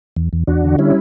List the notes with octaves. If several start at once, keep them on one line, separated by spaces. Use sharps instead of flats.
E2
E2
E2 D4 F#4
D3
G3 C#4 E4